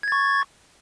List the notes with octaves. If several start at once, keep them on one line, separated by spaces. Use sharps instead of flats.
C#6 G#6 A6